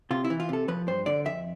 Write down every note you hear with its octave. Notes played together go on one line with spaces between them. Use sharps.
C3 F4
E4
E3
F4
C3 A4
F3 B4
G2 C5
D3 D5
F2 E5